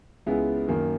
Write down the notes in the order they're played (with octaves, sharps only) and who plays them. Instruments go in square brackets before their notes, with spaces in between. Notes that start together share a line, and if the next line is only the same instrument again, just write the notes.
[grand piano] C#2 C#3 G#3 B3 E4
F#2 D#3 A#3